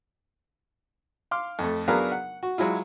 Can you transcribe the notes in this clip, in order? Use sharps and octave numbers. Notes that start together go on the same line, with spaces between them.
F5 C6 D6 F6
F2 A3
F#3 B3 D4 G#4 A#4 F5
F#5
F#4
F#3 G#3 E4 F4